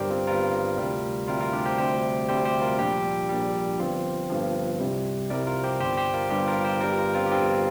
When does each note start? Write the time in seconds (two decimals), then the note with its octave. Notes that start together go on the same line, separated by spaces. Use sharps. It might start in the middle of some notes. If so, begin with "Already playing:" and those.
Already playing: G1 G2 G3 G4 A#4 C5 D5
0.10 C4 F4
0.27 G1 G2 G3 F4 A#4
0.78 D2 C3 G3
1.28 D2 C3 G3 F4 A#4
1.40 F4 A#4
1.53 D4 G4
1.66 G4 C5
1.78 D2 C3 G3 G4 C5
2.28 D2 C3 G3 G4 C5
2.45 G4 C5
2.62 F4 A#4
2.78 A#1 A#2 G3 D4 G4
3.29 A#1 A#2 G3
3.79 G1 G2 F3 C4 F4
4.30 G1 G2 F3
4.80 C2 C3 G3
5.30 C2 C3 G3 A#4 D5
5.47 F4 A#4
5.64 G4 C5
5.80 G1 G2 G3 G4 C5
5.97 G4 C5
6.14 F4 A#4
6.30 G1 G2 G3 D4 G4
6.48 F4 A#4
6.64 G4 C5
6.81 G1 G2 G3 A#4 D5
6.92 G4
6.98 F4 A#4
7.15 C4 F4
7.26 G4
7.31 G1 G2 G3 C4 F4